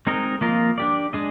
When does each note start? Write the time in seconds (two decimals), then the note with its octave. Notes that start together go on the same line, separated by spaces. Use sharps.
0.07 G#3 C4 D#4 A#4 D#5
0.41 F3 A#3 F4 A#4 D#5
0.78 D4 G4 D5
1.13 G#3 D4 G#4 D#5